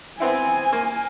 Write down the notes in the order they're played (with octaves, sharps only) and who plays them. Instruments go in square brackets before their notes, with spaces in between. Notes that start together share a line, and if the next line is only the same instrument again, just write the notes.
[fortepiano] B3 C4 E4 [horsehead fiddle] G#5
[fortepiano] A#3